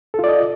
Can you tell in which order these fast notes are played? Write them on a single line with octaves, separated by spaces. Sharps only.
A4 F4 D5 D#5